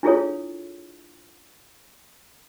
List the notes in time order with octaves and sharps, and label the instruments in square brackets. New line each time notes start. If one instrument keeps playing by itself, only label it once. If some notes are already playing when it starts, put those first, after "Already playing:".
[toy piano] D4 E4 F4 G#4 A4 C#5